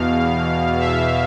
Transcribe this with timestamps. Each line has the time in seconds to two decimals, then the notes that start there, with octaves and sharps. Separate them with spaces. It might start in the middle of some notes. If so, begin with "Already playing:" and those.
Already playing: E2 B2 F5
0.80 E5